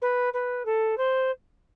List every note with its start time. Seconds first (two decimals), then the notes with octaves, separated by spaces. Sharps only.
0.02 B4
0.33 B4
0.65 A4
0.97 C5